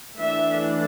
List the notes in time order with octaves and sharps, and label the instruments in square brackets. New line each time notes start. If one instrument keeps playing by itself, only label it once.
[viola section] E3 A3 D4 E5